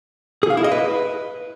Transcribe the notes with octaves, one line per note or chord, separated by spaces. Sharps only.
G#4
F5
E4
D#5
B4